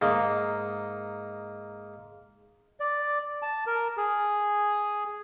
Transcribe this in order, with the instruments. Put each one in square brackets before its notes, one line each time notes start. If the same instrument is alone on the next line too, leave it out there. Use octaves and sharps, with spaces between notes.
[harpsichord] G#2 A#3 D#5
[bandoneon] D5
A5
A#4
G#4